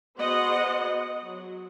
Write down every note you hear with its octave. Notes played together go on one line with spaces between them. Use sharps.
B3 F#4 G#4 C5 D#5 F#5
F#3